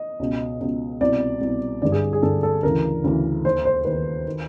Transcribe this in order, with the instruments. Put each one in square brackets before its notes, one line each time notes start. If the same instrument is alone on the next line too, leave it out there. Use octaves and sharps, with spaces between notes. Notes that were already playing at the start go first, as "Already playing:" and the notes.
Already playing: [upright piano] D#5
C#2 B2
C#2 B2
C2 B2 D5
C2 B2
G2 D3 D5
G#4
G#4
G2 D3 A4
A4
D2 C#3 E3 A#4
D2 C#3 E3
D#2 D#3 C5
C5
D#2 D#3 B4
D#3